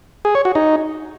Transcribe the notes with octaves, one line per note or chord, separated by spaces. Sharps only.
G#4
C#5
F#4
D#4